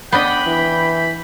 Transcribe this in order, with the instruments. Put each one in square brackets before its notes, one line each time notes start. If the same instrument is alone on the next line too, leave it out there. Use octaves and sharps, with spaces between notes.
[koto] B3 D4 D#5 [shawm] G5 [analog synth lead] B5
[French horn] E3